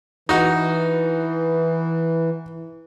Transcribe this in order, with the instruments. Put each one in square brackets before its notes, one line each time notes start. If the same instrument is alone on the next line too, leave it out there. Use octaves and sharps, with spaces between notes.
[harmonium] E3 [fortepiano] D#4 F#4